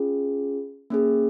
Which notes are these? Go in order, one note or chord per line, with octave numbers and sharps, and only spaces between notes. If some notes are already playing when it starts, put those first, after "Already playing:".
Already playing: C#4 F4 G#4
A#3 C#4 G#4